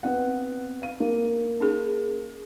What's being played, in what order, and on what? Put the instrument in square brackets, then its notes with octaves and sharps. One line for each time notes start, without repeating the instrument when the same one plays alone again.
[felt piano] B3 C4 F#5
F5 D#7
A#3
[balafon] C#4 D#4 G#4